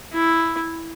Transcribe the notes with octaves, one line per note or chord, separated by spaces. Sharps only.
E4